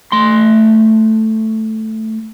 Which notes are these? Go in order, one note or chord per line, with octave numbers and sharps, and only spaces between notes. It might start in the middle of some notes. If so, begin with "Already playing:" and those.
A3 C6